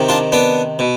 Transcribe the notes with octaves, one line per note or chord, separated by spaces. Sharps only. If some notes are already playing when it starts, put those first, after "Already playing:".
Already playing: C3 D#3
D4 F4
B3 D4
B2